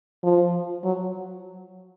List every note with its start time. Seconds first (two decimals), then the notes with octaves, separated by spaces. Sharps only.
0.23 F3
0.84 F#3